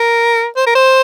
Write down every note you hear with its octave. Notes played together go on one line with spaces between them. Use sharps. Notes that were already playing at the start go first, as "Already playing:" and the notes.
Already playing: A#4
C5
A#4
C5